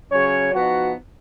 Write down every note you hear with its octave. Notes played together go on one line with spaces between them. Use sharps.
C#3 F#3 C#4 C#5
F3 B3 D#4 F#4